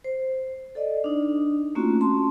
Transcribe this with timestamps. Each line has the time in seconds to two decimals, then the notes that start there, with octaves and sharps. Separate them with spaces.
0.04 C5
0.75 A4 D5 D#5
1.04 D4 D#4
1.75 A3 A#3 C4 C#4 F4 F#4
2.01 C#4 A5 C6